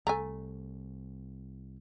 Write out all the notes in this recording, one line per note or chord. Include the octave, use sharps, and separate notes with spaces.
C2 A3 G#5 A#5